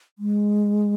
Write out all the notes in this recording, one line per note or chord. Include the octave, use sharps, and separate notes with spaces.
G#3